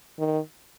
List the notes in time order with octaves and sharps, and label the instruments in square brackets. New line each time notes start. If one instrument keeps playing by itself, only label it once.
[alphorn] D#3